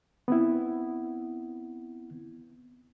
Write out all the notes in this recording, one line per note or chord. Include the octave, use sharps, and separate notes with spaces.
B3 C4 E4